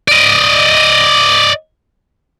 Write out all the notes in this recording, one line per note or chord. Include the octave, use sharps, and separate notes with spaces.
D5 D#5